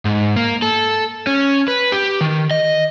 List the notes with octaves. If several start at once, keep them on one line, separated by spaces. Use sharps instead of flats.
G#2
A#3
A4
C#4
B4
G4
D#3
D#5